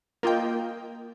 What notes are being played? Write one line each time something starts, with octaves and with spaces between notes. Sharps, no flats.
A#3 F4 D#5 G5